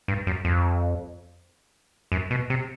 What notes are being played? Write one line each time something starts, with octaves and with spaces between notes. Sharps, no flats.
G2
F#2
F2
F#2
B2
C3